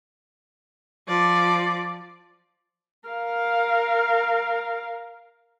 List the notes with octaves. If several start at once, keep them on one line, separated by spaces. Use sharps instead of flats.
F3 D5
A#4 F5